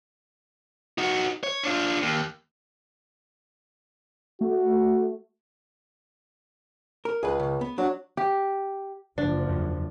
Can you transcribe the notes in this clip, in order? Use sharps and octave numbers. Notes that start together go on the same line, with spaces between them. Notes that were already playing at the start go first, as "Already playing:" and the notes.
D#4 F#4
C#5
D4 F4
D#2
A3 F#4
A#4
C#2 G#4 B4
C#3
B3
F#3 D4
G4
F#1 F#2 F3 D4
E2